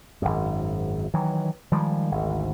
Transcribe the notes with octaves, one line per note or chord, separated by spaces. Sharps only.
G#1 F#2
D#3 E3 F#3
D#3 F3 G3 G#3
G#1 D2